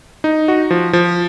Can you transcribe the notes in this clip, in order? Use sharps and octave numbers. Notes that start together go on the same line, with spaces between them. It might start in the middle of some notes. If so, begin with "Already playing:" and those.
D#4
F#4
F3
F3